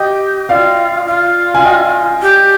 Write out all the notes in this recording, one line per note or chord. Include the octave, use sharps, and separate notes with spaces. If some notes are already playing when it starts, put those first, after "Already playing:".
Already playing: G4 D#5 G5
F4 D5 F5
F4
G#5
D#5 G5
G4